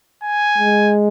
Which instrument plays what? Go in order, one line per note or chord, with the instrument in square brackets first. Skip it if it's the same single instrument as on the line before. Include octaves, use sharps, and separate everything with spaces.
[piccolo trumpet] G#5
[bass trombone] G#3